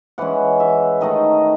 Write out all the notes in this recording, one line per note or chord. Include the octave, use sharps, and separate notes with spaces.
E3 G#3 C#4 F#5
E5
D#3 A3 D#4 D#5